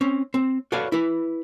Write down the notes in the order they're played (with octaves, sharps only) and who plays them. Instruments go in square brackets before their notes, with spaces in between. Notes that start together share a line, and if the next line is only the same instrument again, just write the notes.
[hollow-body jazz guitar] C4 C#4
C4
F#4 A4 B4 C#5 D5 F5
E4 B4